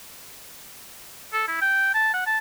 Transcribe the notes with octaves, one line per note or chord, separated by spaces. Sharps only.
A4
E4
G5
A5
F#5
A5